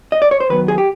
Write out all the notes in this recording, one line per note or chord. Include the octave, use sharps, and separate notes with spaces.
D#5
D5
C#5
C5
D#3 F#3 B3 B4
G#4
G4